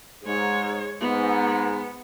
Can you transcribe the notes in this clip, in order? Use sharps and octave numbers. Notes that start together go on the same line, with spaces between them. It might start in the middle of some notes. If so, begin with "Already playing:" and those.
G#2 G#3 C#5
G#2 B3